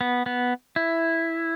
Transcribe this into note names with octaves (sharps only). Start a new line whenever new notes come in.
B3
B3
E4